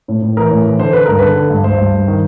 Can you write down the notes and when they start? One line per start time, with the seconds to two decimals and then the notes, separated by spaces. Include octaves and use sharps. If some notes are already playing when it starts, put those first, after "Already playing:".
0.08 A2
0.22 A2
0.37 E3 A#4
0.51 A2
0.66 E3
0.79 D3 C5
0.93 D3 B4
1.06 G2 A#4
1.19 D3 B4
1.36 D3
1.50 G2
1.64 G2 C5
1.78 G2
1.94 G2
2.08 D#3